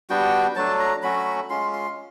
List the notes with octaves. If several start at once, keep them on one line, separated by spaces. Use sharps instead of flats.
G3 B3 D4 F#4 G5
F#3 A3 D4 A5
A#5
F#3 A3 C#4 F#4 B5
G#3 C#4 F4 C6
C6